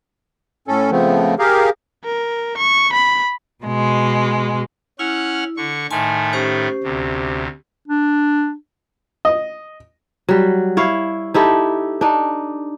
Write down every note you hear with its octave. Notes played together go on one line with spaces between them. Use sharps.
A2 C#4 A4
C#3 F3 A3 B3 C4
G4 G#4 A#4 F5
A#4
C#6
B5
B2 G#3
C#4 E4 F#5 F6
D3 C#6
A2 D#3 A3 G#5 A5 C6
C#4 G4 C5
D2 C3
D4
D#5
F#3 G3
E4 C#5 F5
D#4 E4 G4 A4
D4 D#4